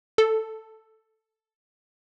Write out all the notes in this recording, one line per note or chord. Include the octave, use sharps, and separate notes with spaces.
A4